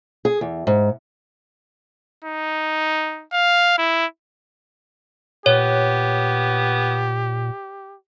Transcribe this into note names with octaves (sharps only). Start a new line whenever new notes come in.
G#4
E2
G#2
D#4
F5
E4
A#2 B3 G4 C#5